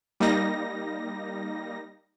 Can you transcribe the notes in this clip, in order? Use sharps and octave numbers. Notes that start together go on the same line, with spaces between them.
G3 A#3 D#4 A#6